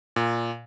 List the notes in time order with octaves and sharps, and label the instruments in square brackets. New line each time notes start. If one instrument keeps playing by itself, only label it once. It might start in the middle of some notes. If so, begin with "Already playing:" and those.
[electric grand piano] A#2